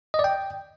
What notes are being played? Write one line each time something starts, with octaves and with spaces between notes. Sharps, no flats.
D#5
D5
G5